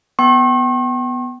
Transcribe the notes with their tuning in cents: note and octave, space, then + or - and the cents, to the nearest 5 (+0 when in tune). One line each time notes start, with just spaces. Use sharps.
B3 +0 G5 -35 C#6 -45